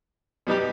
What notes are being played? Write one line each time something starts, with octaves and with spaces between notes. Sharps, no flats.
B2 G3 B3 D#4 G4